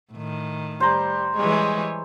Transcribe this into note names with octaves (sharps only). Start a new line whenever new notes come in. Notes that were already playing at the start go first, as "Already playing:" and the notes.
A2 D#3
G3 C5 A#5
E3 G3 G#3 C#5